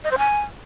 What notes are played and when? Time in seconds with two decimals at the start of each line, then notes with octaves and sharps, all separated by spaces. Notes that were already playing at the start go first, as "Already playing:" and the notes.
0.04 D#5
0.11 C5
0.18 G#5